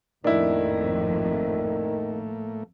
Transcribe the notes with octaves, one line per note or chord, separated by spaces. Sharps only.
G#1 F2 A2 D#3 A3 A#3 D4 E4